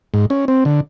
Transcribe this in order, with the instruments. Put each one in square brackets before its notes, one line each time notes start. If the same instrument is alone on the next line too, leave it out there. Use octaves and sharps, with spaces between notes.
[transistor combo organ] G#2
C#4
C4
D3